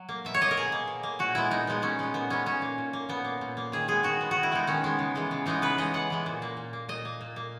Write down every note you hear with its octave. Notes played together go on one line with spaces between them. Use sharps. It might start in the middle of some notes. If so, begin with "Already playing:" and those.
Already playing: F#3
A#3
B2 E5
C#5
A#3 D#5
A#4
B2 G#4
A#3
B2
A#3
A#2 F#4
G#3 B3 E4
A#2 D#4
G#3 B3
A#2 C#4
G#3 B3
A#2 B3
G#3 B3 C#4
A#2 C#4
A#3
A#2
A#3
A#2 B3
A#3
A#2
A#3
D#3 G#4
G#3 B3 G#4
D#3 F#4
G#3 B3
F#4
D#3
E4
G#3 B3 D#4
D#3 C#4
G#3 B3
C#3
E3 G#3 B3
C#3
E3 G#3 B3 D#4
C#3 B4
E3 G#3 B3 D#5
C#3 F#5
E3 G#3 B3
A#2
A#3
A#2
A#3
A#2 D#5
A#3
A#2
A#3